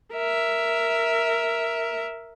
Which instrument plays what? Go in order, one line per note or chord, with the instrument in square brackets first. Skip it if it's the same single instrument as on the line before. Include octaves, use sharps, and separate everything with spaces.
[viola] A#4 E5